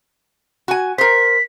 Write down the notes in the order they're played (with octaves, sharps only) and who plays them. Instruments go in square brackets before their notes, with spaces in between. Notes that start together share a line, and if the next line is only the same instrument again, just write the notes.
[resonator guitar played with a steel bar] F#4 G#5
[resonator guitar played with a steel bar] A#4 C5 [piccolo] B6